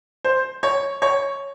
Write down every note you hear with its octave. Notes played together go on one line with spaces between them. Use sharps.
C5
C#5
C#5